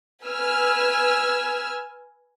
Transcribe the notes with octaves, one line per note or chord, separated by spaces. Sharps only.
B4 G#5 E6 F6